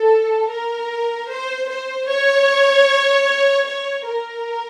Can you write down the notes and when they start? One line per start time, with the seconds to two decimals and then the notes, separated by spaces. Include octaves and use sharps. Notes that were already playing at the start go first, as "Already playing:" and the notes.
Already playing: A4
0.51 A#4
1.31 C5
1.69 C5
2.09 C#5
3.67 C#5
4.07 A#4